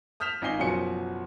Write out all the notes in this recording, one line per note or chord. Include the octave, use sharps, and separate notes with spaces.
D#6 F6 G6 B6 E7 F7
G#1 D#4 D#5 G#5 C7 G7
F#1 B2 F3 F#3 G#5 C#7